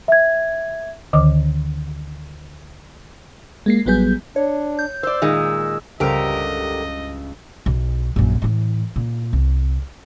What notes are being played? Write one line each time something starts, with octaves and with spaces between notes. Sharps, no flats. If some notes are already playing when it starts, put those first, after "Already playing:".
E5 G#6
D2 D3 D#3 D#5 D6
G#3 A#3 C7
A1 F#3 G3 B3 G#4 G6
D4 C#5
G6
C5 D5 E6
A#2 D#3 G#3
C#2 G2 D3 G4 A#4 C5 D#5 E6
B1
A#1 F#2
A2 E3
A#2
C2